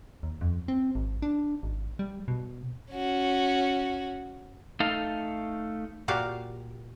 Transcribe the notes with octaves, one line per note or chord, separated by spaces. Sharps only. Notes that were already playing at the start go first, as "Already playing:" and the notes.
D#2
F2
C4
G#1
D4
G#1
G3
B2
C#4 F#4
A3 D#4 A4 F5
A#2 F#4 G4 F5